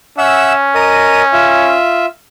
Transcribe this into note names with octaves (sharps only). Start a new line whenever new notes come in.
C#4 E5 F#5 E6
A#4 D#5 D#6
F4 E5